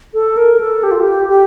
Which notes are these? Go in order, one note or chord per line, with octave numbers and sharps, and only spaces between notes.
A4
A#4
A4
G4
F4
G4
G4